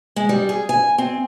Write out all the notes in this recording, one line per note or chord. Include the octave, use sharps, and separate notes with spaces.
G#3
G3
G#4
G#5
C4